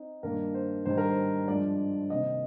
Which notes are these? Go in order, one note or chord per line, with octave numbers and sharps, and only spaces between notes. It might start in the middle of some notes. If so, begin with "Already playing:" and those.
Already playing: C4 D#4
G2 D#3 A#3 D4 A#4
C5
G#2 D#3 G3 D4 C5
A#4
C5
G2 F3 G#3 D4 D5
C3 D#3 A#3 D#5